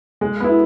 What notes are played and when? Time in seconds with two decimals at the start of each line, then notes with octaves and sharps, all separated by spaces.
0.21 G#3
0.40 B3 E4